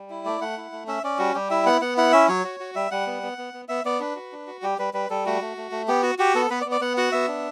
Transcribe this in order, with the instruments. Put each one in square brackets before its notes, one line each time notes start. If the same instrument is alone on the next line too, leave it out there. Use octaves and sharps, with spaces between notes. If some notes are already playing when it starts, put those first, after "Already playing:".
Already playing: [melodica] G3
E4
A3 D5
A3 F#5
E4
A3
C#4 E5
C#4 D5
G3 F#4
G3 G4
E4 E5
B3 F#5
B3 F#5
E4 F#5
C#4 E5
F#3 C#5
F#4
F#4
G3 E5
G3 F#5
B3
B3
B3
B3
B3 E5
B3 D5
D4 B4
F#4
D4
F#4
G3 G4
G3 B4
G3 B4
G3 A4
A3 F#4
A3
A3
A3
B3 G4
F#4
F#4 G4
B3 A4
B3 B4
D5
B3
D5
B3 F#5
F#4 F#5
B3 E5
D4